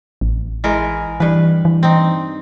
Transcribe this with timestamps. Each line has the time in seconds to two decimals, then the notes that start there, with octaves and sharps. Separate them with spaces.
0.21 A1
0.64 E3 G#3 A#4
1.20 G2 E3 B4
1.65 E3
1.83 C4 D#4